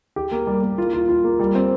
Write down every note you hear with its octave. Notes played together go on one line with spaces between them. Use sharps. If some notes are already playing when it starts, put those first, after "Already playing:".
G4
A#3
G3
A#3
F4
F4
F4
A#3
G3
C4